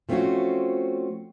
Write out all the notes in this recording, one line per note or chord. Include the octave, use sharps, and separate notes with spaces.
F3 A3 C4 C#4 F4 F#4